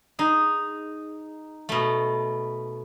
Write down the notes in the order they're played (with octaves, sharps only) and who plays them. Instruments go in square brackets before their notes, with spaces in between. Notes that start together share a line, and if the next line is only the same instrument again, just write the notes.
[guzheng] D#4 G#4
B2 A3